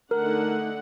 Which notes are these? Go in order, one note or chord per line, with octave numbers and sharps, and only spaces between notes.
D3 A3 D#4 A#4 F#5